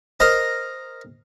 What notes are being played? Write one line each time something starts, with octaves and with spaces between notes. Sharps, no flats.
A#4 C5 D#5 A#5 D#6